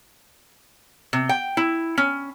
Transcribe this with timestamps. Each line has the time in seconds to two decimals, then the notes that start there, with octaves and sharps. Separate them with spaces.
1.13 C3
1.29 G5
1.57 E4
1.98 C#4